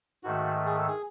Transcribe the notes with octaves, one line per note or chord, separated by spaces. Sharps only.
G#2 D#3 A3 F#4
G#4
A4
G#4